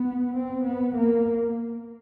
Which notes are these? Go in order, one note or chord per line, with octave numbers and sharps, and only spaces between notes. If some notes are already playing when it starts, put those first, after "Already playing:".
Already playing: B3
C4
B3
A#3